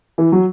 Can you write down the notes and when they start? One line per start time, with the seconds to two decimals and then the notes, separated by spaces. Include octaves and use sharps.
0.18 E3
0.32 F#3